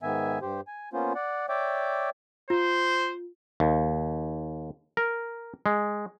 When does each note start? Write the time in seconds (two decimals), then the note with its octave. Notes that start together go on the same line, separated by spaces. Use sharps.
0.02 G#2 D#3 B3 E5 G#5
0.42 G2 G4 C5
0.67 G#5
0.93 A#3 B3 C#4 F4 C5
1.15 D5 F#5
1.49 C#5 D5 E5 G5 D6
2.50 F4 C5
3.60 D#2
4.97 A#4
5.66 G#3